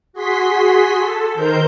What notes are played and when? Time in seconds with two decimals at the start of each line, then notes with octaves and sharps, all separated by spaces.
0.13 F#4 G#4 C6 B6
0.97 A4
1.34 D#3 A#4 C5 G6